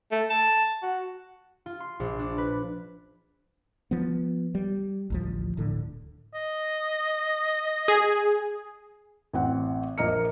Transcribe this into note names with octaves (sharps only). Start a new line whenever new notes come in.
A3
A5
F#4
F4
C6
A#1
D4
B4
F3 B3
G3
A1 D2 F3
D1 A2 D3
D#5
G#4
A1 C4 F#5
A#1 A#3 D#5 A#5 F6 C#7